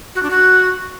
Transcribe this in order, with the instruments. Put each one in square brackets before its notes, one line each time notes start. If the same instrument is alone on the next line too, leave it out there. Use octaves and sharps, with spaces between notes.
[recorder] F#4
D4
F#4